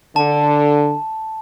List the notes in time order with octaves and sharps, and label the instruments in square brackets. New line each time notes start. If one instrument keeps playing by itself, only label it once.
[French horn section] D3 [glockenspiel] A5